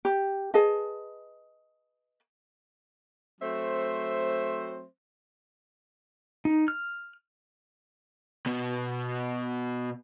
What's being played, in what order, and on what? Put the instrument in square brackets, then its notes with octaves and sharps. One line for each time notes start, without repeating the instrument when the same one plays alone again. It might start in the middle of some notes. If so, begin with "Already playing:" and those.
[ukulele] G4
G#4 B4 D#5 A5
[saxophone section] F#3 A3 C4 C5 E5
[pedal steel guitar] D#4
F6
[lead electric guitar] B2 B3